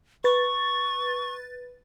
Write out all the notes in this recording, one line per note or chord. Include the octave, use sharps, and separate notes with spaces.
B4 C#6 A6